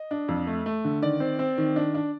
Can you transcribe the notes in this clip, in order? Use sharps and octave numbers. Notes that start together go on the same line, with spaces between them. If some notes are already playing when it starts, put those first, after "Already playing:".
Already playing: D#5
D4
F2
A3
A3
D3
D#3 D5
C4
C4
D#3
D4
D4